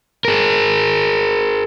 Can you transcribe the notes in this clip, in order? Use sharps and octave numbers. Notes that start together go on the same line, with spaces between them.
G#4 A#4